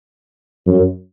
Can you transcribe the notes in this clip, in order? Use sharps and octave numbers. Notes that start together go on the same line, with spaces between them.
F#2